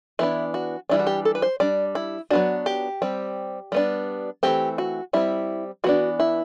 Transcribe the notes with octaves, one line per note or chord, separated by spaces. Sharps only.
E3 B3 D4 E4
F#4
E3 G3 D4 E4
F#4
G4
A4
B4
C5
G3 D4 D5
E4
F#3 B3 D4 F#4
G4
G3 C4
G3 B3 D4
E3 A3 C4 G4
F#4
G3 C4 E4
E3 B3 D4 F#4
E4